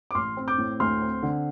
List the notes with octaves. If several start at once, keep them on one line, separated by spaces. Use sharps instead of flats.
D6
A1 C6 F6
C4
D6 G6
A2
D2 C6 F6
C4
D3